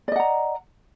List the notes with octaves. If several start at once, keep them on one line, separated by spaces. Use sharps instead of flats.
D5 D#5 F#5 A#5